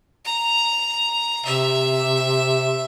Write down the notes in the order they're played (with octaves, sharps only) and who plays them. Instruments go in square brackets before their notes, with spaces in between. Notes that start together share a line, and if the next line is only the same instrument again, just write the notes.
[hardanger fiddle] A#5
[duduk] C3 [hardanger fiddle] E5